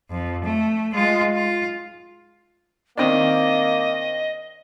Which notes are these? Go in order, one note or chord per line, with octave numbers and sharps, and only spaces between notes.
F2
A3
G#3 F4
F4
D#3 A#3 C4 D4 D#5